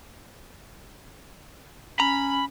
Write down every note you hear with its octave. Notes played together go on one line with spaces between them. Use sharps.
C#4 A#5 B5